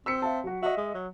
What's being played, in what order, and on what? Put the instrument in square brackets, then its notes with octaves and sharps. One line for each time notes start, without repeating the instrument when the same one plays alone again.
[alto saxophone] C4 [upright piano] E6 B6 C#7
[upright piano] E5 F5 A5
F#3 F#4
[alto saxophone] F#4 [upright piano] D#5 E5
[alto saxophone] G#3
F#3